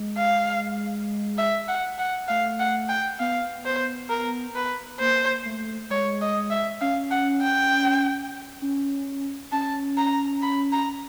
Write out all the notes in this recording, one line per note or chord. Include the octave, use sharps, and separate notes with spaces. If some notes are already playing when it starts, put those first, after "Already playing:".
Already playing: G#3
F5
E5
F#5
F#5
A3 F5
F#5
G5
B3 F5
C5
A#4
B4
A#3 C5
A3
G#3 C#5
D#5
E5
C#4 F5
F#5
G5
C#4
C#4 A5
A#5
B5
A#5